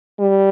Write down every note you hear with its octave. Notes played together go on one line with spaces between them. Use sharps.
G3